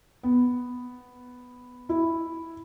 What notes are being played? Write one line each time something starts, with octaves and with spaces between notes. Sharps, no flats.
B3
E4